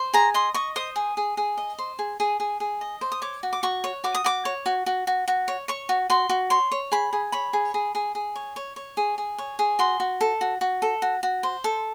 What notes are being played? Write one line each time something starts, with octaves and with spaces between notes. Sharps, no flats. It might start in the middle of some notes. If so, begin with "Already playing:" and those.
Already playing: C5
G#4 A#5
D#5 C6
D#5 C#6
C5 D#6
G#4
G#4
G#4
D#5
C5
G#4
G#4
G#4
G#4
D#5
C5
D#6
C#5 D6
F#4
D6
F#4 C#6
C#5
F#4 D6
D#6
F#4 D6
C#5
F#4
F#4
F#4
F#4
C#5
C#5 C#6
F#4
F#4 C6
F#4
C#5 C6
C#5
G#4 B5
G#4
C#5 B5
G#4
G#4
G#4
G#4
C#5
C#5
C#5
G#4
G#4
C#5
G#4
F#4 C6
F#4
A4
F#4
F#4
A4
F#4
F#4
C5
A4